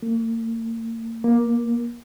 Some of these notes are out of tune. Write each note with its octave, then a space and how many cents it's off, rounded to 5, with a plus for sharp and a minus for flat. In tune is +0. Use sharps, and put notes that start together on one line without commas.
A#3 -40
A#3 +15